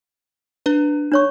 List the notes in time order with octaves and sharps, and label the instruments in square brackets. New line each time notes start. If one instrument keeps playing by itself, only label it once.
[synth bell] D4 B4
[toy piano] D4 C#5 C#6